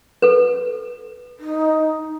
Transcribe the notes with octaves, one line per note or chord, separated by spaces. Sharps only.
A4 B4
D#4